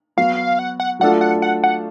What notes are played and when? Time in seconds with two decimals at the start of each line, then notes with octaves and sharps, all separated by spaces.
0.17 F#3 B3 F#4 F5
0.59 F#5
0.80 F#5
0.99 F#3 A3 D4 F4 A4 F#5
1.21 F#5
1.42 F#5
1.64 F#5